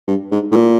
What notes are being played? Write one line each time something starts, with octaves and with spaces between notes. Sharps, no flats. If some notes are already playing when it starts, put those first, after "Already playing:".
G2
G#2
A2
A#2